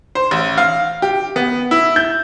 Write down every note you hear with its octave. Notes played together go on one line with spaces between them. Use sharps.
C5
A1
F5
G4
B3
E4
G6